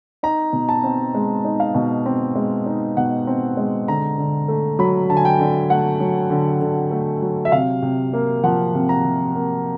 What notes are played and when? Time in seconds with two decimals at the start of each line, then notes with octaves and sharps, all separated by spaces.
0.23 D#4 A#5
0.53 B2
0.69 A5
0.83 C4
1.15 G#3
1.44 D#4
1.60 F5
1.75 B2
2.06 C4
2.35 G#3
2.66 D#4
2.97 B2 F#5
3.27 C4
3.57 G#3
3.88 D3 A#5
4.18 D3
4.48 A3
4.79 F#3 B5
5.09 D3 A5
5.17 G#5
5.25 G5
5.40 D3
5.70 A3 F#5
6.00 F#3
6.30 D3
6.61 D3
6.91 A3
7.22 F#3
7.45 E5
7.52 C3 F5
7.82 C3
8.13 A#3
8.44 F3 F#5
8.75 C3
8.89 A#5
9.04 C3
9.35 A#3